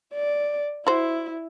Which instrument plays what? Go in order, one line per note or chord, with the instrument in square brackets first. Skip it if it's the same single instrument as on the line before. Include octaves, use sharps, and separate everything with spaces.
[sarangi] D5
[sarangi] E4 [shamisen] F#4 C5